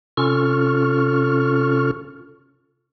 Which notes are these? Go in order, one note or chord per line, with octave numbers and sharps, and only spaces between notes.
C3 C#4 F4 A4 C#6 F6